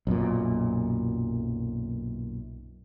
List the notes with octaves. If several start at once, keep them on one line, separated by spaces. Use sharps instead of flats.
B1 F#2 A#2